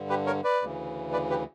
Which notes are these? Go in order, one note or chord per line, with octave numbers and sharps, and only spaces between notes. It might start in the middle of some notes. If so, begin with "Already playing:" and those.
Already playing: G2 D3
G4 B4
A#4 C#5
B4 D5
D2 C#3 E3
B4 D5
G4 B4